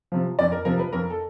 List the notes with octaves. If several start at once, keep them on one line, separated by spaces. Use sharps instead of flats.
C3 F3
F2 D5
A#4
C3 F3 A#4
B4
F2 A#4
A4